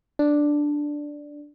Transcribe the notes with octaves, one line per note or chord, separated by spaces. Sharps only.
D4